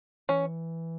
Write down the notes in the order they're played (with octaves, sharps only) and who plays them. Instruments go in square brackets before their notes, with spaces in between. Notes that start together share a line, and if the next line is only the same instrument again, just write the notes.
[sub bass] E3 [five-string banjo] C#4